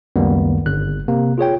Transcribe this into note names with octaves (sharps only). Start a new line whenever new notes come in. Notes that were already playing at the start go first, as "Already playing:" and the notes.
C#2 F#2 D#3 G3 A#3 B3
G1 F#6
C3 A#3
F4 G#4 C#5 G5